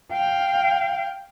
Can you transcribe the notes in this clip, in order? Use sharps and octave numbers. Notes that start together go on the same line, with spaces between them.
F5 G5